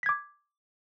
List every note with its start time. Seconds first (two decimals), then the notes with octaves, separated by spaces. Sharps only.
0.03 B6
0.06 G#6
0.09 D6